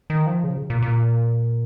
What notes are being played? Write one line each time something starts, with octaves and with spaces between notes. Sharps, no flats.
D#3
F3
C#3
A#2
A#2